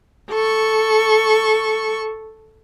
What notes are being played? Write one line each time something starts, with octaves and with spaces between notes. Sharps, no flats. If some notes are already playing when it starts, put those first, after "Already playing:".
A4 C#6